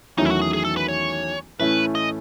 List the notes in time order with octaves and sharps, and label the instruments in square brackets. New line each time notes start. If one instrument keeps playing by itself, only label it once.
[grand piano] E2 D#3 F#3 A3 C#4 [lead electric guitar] D#4
[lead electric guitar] E4
F#4
G#4
G#4
A4
B4
C#5
[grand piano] A2 E3 A3 C#4 E4 [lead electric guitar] B4
[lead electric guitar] D#5